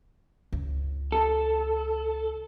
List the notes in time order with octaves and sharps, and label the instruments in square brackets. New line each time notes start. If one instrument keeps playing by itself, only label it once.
[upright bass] C#2
[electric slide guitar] A4